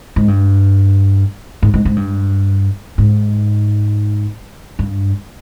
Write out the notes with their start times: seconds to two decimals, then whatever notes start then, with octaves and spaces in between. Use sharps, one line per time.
0.16 G#2
0.28 G2
1.63 G#2
1.74 G#2
1.85 G#2
1.96 G2
2.98 G#2
4.79 G2